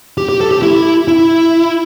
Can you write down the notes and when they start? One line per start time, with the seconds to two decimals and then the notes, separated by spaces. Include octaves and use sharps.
0.18 G4
0.29 G4
0.41 A4
0.51 G4
0.62 E4
1.08 E4